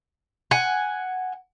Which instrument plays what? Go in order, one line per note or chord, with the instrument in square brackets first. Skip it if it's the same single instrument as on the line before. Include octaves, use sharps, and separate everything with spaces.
[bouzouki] F#5 G#5